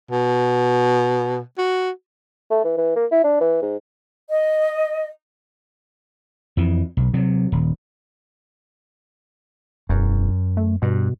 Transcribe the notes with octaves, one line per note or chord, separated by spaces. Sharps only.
B2
F#4
A3
E3
E3
A#3
E4
D4
E3
G#2
D#5
F2 E3
B1
C3 F#3
D#1
E1 F#2
A3
G2 B2